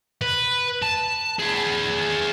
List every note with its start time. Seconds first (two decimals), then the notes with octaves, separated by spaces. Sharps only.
0.22 B4
0.82 A5
1.39 G#4 B4